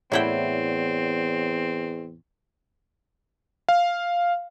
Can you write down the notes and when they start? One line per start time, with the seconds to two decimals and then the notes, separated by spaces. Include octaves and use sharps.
0.12 E2 A2 C4 E4 C#5 D5 F#5 G5
3.69 F5